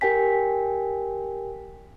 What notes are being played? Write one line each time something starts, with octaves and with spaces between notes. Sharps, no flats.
G4 A#4 G5 G#5 B6